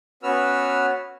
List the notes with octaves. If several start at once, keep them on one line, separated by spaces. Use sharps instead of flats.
B3 C#4 F#4 B4 E6 F6